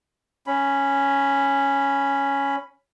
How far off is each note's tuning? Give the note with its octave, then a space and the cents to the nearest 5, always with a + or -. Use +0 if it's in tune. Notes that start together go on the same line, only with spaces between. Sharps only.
C#4 +0 B5 +0